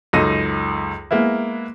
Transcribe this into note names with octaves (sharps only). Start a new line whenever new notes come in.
C#2 F#2 D#4 A4 A#6 D#7
G#3 A#3 B3 E4